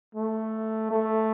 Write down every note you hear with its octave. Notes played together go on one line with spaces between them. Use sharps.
A3
A3